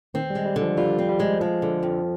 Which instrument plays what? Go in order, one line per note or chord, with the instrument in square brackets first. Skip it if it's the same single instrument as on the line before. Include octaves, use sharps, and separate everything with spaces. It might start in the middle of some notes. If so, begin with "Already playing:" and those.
[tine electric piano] D#3 [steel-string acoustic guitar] C4
[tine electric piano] G3
[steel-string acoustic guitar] G#3
[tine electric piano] G3
[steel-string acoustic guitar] D3
[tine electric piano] F3
[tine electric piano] G3 [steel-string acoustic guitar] F4
[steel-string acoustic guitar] C4
[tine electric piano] G3
[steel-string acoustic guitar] G#3
[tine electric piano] F3 [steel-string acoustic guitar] G#3
[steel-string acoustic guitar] D3
F2